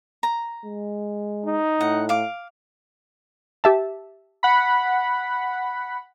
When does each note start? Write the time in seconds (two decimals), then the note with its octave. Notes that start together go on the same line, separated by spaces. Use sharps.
0.23 A#5
0.65 G#3
1.46 D#4
1.81 A2 F#5
2.09 F5 D6
3.64 G4 E5 A5
4.43 F#5 B5